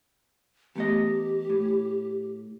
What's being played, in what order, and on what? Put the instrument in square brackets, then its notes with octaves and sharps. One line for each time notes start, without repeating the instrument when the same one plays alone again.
[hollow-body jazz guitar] E2 A3 D#5 [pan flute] G4
[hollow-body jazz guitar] A2